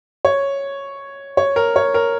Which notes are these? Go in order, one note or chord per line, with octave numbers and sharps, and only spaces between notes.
C#5
C#5
A#4
C#5
A#4